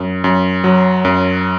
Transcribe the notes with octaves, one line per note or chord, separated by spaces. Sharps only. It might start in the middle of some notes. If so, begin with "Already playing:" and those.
Already playing: F#2
F#2
F#3
F#2